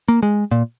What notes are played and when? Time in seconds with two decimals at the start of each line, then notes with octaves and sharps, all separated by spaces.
0.08 A#3
0.23 G#3
0.51 A#2